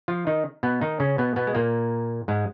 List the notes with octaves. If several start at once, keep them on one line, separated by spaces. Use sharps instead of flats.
F3 F4
D#3 D#4
B2 B3
D#3 D#4
C#3 C#4
B2 B3
B2 B3
G#3
A#2 A#3
G#2 G#3